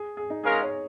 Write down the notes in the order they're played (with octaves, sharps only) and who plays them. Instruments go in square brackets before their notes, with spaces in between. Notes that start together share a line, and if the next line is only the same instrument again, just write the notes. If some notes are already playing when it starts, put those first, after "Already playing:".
Already playing: [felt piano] G#4
G#4
D#4
[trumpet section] G#3 C#4 A#4 F5 [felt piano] G#4
[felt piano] C#5